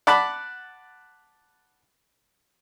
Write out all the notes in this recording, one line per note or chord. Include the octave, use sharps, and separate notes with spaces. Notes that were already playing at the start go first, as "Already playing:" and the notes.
D5 F#5 A5 B5